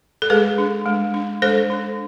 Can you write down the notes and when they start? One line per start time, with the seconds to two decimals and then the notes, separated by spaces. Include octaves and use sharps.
0.22 A4
0.30 G#3 G#4 B4
0.58 D4
0.86 G#3
1.14 D4
1.42 G#3 A4 C5
1.70 D4